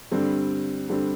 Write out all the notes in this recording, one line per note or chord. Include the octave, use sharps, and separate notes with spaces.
G2 D3 G3 C4
G2 D3 G3 C4